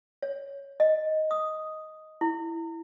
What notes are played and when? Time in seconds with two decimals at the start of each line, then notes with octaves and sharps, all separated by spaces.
0.22 C#5
0.80 D#5
1.31 D#6
2.21 E4